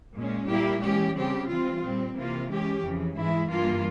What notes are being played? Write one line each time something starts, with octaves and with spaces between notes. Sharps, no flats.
A#2 G#3 C#4
A#2 G3 A#3 E4 G4
E3 G#3 C#4 G4
C#3 G3 C4 G4
E3 G3 C4 F4
A#2 G3 C4
C3 E3 A#3 F4
E3 G#3 C#4 G4
F2 C#3 E3
G#2 E3 G#3 E4
G2 E3 A#3 F4